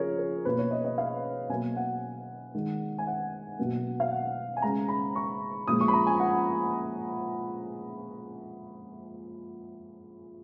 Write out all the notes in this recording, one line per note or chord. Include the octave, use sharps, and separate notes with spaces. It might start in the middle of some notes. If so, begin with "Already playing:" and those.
Already playing: C#3 F3 G#4 A#4 C#5
A#4
B2 A#3 B4
C#5
D#5
D#5
F5
B2 F#3 A#3 G#5
F#5
D#3 G#3
G#5
F#5
B2 F#3 A#3
F5
F#5
G#5
C#3 G#3 A#5
B5
C#6
A#2 F3 G#3 D#6
C#6
B5
A#5
G#5
F#5